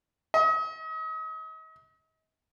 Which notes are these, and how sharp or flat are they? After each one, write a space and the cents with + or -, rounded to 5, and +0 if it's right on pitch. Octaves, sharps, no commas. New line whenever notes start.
D#5 +40